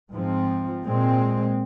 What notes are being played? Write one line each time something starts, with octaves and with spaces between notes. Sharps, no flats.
G#2 F3 C4
A#2 G#3 C4